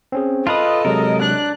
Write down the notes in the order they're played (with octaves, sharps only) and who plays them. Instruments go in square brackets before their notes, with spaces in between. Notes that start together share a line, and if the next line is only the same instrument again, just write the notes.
[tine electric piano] C4 C#4 G#4
[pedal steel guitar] F4 B4 [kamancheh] A4 D#5 [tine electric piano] A5 D#6
[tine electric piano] C3 F#3 G#3 [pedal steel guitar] A#4
[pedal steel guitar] D4 [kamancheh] F#6